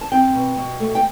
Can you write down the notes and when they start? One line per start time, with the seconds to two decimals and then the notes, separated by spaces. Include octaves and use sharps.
0.01 A5
0.12 C4 G5
0.35 B2
0.57 B2
0.80 A3
0.95 G5